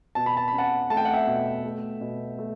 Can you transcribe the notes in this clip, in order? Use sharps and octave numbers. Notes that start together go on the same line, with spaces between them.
B2 A5
B5
A5
C#4 B5
F#5 A5
A3 A5
G5
F#5
E5 G5
B2
A3
B2
A3